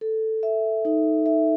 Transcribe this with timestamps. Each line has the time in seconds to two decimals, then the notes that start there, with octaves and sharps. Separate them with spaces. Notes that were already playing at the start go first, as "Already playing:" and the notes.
0.01 A4
0.43 E5
0.85 D#4
1.26 E5